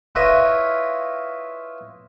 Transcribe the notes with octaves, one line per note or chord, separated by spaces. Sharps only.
E4 F4 B4 C#5 D#5